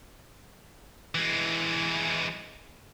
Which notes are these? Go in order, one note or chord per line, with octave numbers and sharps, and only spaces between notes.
E3 G#3